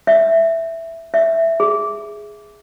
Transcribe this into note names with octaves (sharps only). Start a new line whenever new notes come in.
E5
E5
G#4